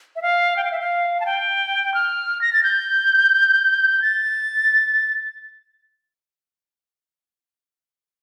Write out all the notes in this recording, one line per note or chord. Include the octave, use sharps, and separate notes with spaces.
E5
F5
G5
F5
E5
F5
A5
G5
F6
A#6
A6
G6
A6